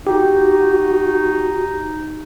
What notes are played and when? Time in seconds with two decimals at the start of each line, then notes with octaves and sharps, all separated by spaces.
0.07 D#4 F#4 G4